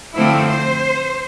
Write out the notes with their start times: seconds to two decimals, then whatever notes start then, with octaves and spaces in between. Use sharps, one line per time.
0.14 D3 F3 A3 C4 E4
0.47 C5